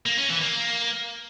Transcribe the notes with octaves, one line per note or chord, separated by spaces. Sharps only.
A#3
C#4
E3
A#3